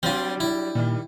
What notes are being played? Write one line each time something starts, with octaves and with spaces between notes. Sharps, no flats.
F#3 G3 C4 D4 F4
E4
A#2 D#3 G3